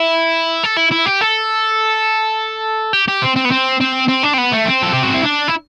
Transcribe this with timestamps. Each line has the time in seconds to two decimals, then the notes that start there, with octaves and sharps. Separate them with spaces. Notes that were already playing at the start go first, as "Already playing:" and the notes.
Already playing: E4
0.64 A4
0.77 E4
0.92 E4
1.06 G4
1.21 A4
2.93 G4
3.08 G4
3.22 C4
3.36 C4
3.45 B3
3.51 C4
3.81 C4
4.08 C4
4.23 D4
4.34 C4
4.38 B3
4.53 A3
4.66 C4
4.83 A4
4.93 G4
5.03 F#4
5.14 E4
5.24 D4
5.48 E4